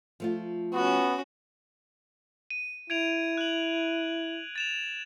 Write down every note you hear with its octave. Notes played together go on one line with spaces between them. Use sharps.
F3 A3 F4
B3 C#4 F#4
D#7
E4 G#6 D7 F7
F#6 F#7
A6 E7 F7